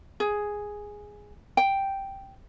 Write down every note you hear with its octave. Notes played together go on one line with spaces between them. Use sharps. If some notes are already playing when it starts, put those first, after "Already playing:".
G#4
G5